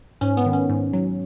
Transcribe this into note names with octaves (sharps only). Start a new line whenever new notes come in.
G#2 C#4
B3
D#3
C#4
G#2
F#3